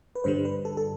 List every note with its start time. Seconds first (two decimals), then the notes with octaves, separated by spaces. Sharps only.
0.15 B4
0.24 G2 D3 G3 C5
0.45 B4
0.65 A4
0.77 A4